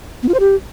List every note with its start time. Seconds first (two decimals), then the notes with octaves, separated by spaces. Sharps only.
0.23 B3
0.28 F4
0.34 C5
0.40 G4